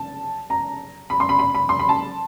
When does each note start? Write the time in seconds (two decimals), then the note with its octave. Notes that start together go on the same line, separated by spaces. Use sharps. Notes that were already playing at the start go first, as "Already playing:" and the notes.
Already playing: A5
0.50 A#5
1.10 B5
1.20 C6
1.29 B5
1.39 B5
1.55 B5
1.69 C6
1.79 B5
1.89 A5